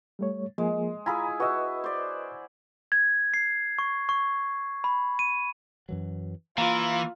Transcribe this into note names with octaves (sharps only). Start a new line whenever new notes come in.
G3 A3 C#5
F3 G#3 A#3 G#4
E4 F4 G#4 G#5 A#5 B5
F#4 B4 D#5 E5
C5 D5
G#6
C7
C#6
C#6
B5
D#7
F#2 E3 F#3
E3 A#3 F4 F5 A#5